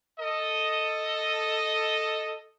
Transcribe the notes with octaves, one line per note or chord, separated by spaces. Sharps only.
A4 D#5